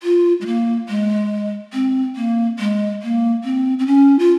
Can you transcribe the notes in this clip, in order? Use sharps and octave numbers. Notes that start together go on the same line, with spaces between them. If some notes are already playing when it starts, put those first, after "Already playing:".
F4
G#3
A#3
G#3
C4
A#3
G#3
A#3
C4
C4
C#4
F4